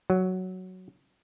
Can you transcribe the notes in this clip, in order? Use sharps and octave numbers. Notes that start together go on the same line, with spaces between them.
F#3